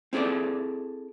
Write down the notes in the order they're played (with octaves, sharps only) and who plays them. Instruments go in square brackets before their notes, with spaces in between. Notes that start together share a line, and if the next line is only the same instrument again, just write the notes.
[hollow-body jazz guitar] C4 E4 G#4 A4 D5